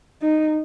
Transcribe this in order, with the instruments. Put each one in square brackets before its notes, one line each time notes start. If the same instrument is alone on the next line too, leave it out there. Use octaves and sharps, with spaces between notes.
[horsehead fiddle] D#4